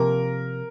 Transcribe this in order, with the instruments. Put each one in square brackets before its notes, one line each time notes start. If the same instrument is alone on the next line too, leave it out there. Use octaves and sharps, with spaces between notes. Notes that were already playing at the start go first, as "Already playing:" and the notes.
Already playing: [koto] C3 F3 A#3 [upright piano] A#4